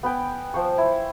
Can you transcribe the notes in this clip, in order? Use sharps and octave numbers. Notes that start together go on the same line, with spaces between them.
B3 B4 G5 G#5
F3 C5 C#6
E4